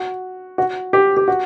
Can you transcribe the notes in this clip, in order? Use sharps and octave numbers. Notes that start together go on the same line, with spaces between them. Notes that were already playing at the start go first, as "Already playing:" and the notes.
Already playing: F#4
F#4
G4
G4
F#4